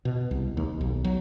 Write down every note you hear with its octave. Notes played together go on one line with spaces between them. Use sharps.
B2
C2
D#2
B1
F#3